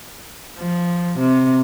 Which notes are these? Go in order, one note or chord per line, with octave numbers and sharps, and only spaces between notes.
F3
C3